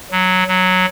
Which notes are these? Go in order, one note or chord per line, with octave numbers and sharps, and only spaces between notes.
F#3
F#3